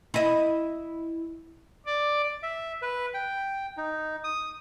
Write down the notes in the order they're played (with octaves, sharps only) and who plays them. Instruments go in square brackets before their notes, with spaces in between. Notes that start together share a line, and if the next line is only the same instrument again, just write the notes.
[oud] E4 D#5
[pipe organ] D5
[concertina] E5
B4
G5
D#4
D#6